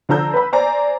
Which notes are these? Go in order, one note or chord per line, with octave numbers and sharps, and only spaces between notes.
D3 F3 A#5 E6 G6
B4 B5
C5 D5 G#5 A#5